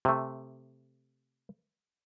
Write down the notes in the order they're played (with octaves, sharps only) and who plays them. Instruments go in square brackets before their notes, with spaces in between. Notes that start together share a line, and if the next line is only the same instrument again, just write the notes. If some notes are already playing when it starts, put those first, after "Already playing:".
[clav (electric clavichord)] C3 A3